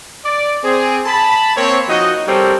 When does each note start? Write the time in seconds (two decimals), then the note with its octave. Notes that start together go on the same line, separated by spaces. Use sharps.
0.25 D5
0.64 C4 G#4
1.06 A5 B5
1.56 A#3 C4 C#5
1.88 F3 D#4 F#4 D#5
2.27 G3 C4 G4 A4 A#4 C#5